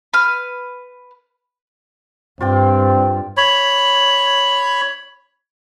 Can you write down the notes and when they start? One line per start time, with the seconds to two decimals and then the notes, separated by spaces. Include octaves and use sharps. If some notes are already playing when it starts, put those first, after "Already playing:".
0.13 B4 F6
2.41 G2 C4 F4 D5 G5
3.37 C#5 B5